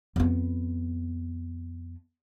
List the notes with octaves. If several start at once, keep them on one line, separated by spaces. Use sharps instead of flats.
F2 B3